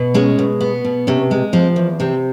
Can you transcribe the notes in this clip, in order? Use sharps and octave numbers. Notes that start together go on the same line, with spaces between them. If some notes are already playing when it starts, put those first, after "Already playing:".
Already playing: B2 B3
G#3 C#4
B2
B3
B2
C3 C#4
G#3
F3 C4
E2
C3 C4